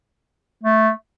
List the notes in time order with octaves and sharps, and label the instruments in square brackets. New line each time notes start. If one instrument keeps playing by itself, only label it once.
[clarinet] A3